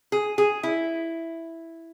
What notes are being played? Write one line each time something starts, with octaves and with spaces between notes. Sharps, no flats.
G#4
G#4
E4